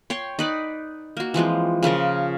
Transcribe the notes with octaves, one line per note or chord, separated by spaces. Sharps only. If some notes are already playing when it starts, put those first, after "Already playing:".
C#5 G5 C6
D#4 B4 D5
A#3 F#4
E3 F3 G#3 C4
C#3 F3 F4 A#4